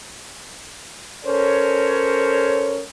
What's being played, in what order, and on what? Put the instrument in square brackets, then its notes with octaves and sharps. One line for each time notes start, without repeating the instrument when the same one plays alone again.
[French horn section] C#4 A4 A#4 C5 C#5